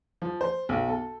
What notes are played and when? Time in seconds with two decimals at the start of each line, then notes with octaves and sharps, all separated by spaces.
0.22 F3
0.41 C5
0.69 B1
0.89 A4